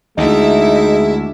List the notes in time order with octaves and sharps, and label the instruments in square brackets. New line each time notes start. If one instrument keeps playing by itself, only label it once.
[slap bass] D2 [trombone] G#3 [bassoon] D#4 [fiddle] E4 E5